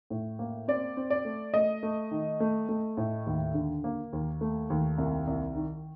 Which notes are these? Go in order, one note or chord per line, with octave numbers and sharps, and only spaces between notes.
A2
A#3
C4 D5
C4
D5
A3
A3 D#5
A3
D#3
A3
A3
A2
D#2
D3
A#3
D#2
A3
D#2
C2
C2
D#3